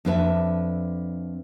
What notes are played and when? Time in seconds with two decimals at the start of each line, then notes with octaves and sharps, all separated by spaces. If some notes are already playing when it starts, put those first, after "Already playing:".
0.05 F2 D4 B4 E5